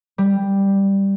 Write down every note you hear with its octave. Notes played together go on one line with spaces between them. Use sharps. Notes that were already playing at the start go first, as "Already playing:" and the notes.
G3